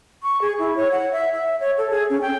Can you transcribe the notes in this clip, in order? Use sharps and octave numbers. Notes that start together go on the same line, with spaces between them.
C#6
G#4
E4
C#5
F#5
E5
E5
C#5
A4
G#4
C#4
G5